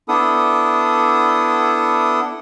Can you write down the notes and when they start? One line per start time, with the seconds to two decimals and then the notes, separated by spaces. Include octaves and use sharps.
0.08 B3 D4 E4 A4 D#6